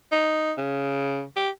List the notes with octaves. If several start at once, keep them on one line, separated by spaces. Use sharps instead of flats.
D#4
C#3
G4